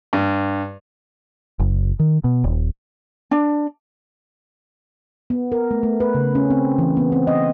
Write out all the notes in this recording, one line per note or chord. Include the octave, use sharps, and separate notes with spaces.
G2
F#1
D#3
B2
D#1
D4
B3
A#4
A3
A3
B4
C#3
C#4
C4
E3
B3
C4
D#5